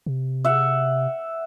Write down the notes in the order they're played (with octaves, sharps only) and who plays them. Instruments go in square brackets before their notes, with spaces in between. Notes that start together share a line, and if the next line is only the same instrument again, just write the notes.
[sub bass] C3
[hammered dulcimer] E5 F#5